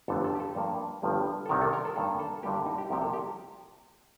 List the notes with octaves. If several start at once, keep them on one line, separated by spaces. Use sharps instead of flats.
G1 F2 D3 A3 A4
A4
G4
A4
G2 F3 A#3
G1 G2 F3
A4
C2 C3 D#3 A#4
A4
A#4
A4
G2 D#3 A#3 A4
A4
G2 D3 G3 A#3 G4
D#4
G4
C2 C3 F3 A#3 G4
A4
G4